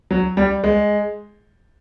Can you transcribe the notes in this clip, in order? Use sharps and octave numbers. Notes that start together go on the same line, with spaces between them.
F#3
G3
G#3